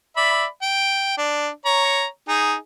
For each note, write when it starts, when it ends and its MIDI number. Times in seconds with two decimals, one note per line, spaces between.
0.17 0.45 74
0.17 0.45 76
0.17 0.45 83
0.62 1.15 79
1.18 1.49 62
1.65 2.05 73
1.65 2.05 82
2.28 2.55 63
2.28 2.55 68